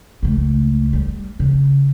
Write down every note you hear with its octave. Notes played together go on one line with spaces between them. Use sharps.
C#2 A3
G3
C#3